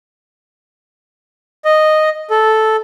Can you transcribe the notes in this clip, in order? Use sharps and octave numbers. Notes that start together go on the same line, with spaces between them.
D#5
A4